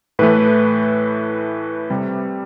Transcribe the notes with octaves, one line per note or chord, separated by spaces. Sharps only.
A2 E3 A3 B4
C3 G3